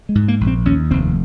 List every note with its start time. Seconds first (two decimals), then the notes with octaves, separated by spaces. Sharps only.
0.09 G#3
0.15 G#2
0.28 A#3
0.41 A#1
0.47 C4
0.65 D#2 C#4
0.91 F1 C4